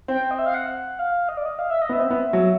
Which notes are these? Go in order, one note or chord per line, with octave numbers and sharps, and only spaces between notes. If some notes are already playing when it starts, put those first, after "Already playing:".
C4 G5
D#5
E5
F5
F#5
F5
D#5
D5
D#5
F5
E5
D#5
B3 E5
C4
B3
F#3